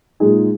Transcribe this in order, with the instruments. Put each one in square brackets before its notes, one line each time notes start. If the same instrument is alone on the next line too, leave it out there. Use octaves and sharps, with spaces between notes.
[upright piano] A#2 G#3 D#4 G#4